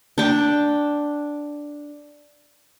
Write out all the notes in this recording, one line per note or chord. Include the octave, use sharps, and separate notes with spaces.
D4 G5